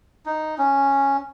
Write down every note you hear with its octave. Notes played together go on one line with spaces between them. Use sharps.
D#4
C#4